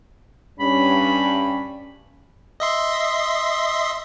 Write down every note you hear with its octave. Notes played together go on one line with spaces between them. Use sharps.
G2 C#4 B5
D#5 E5 C6